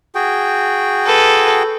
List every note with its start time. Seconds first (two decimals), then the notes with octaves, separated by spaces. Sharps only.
0.15 F#4 G#4 G5
1.06 A4 B4